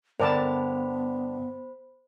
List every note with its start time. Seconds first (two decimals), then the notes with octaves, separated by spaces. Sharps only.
0.20 G2 D3 B3 A#4 C5 D5 A5 B5